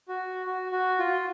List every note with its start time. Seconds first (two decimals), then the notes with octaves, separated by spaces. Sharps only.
0.08 F#4
0.47 F#4
0.72 F#4
0.99 F4